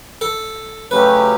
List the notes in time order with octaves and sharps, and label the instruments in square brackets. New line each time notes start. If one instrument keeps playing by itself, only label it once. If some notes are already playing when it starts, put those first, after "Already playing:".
[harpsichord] A4
[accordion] C#3 F#3 A3 C#4 G4 [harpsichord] B4